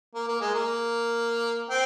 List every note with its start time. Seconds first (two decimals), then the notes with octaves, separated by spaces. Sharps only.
0.15 A#3
0.28 A#3
0.41 G#3
0.54 A#3
1.70 C4